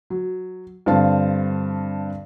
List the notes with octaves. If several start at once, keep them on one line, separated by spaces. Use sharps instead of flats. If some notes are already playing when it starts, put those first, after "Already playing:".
F#3
G2 D3 C4 F5 A5